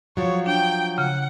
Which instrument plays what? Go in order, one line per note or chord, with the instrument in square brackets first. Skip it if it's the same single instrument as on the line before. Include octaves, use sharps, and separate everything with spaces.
[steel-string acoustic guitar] F3 F#3 [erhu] C#5
[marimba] D4 [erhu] G5
[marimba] C#3 [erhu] F#5